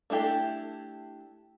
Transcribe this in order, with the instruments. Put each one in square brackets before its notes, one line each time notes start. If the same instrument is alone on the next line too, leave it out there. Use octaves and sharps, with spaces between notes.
[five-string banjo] A3 D4 E4 G4 A4